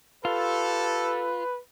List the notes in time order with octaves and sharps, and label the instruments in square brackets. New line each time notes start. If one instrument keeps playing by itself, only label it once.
[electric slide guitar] F4 [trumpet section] G4 A4 [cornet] B4